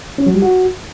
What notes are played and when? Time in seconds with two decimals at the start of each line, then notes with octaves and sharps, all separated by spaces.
0.18 C#4
0.26 F#3
0.34 G3
0.42 F#4